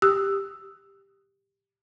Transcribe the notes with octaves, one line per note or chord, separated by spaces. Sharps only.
G4 D#6 E6